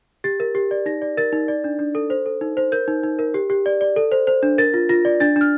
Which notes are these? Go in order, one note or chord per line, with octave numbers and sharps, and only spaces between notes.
G4 A6
A#4
G4
D5
D#4 A#6
D5
A#4 A6
D#4
D5
D4
D4
A4
C5
A4
D#4
C5
A#4 G6
D#4
D#4
A#4
G4
G4
D5
D5
A4
C5
C5
D4
A#4 A6
F4
F4 A#6
D5
D4 A6
D4
F6